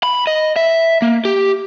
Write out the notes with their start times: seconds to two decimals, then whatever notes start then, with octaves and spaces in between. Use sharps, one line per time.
0.03 B5
0.27 D#5
0.56 E5
1.02 A#3
1.25 G4